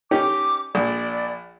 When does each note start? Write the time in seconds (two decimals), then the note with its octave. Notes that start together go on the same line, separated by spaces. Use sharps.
0.11 C#4 D#4 G4 D6
0.75 A#1 D5